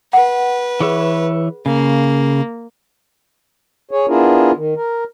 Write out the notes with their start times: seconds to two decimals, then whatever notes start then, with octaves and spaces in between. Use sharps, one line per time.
0.13 B4 F#5
0.81 E3 G#4 C#5 E5
1.66 C#3 A#3
3.91 G#4 C#5
4.08 B3 D4 E4 F4 G#4 A#4
4.56 D#3
4.76 A#4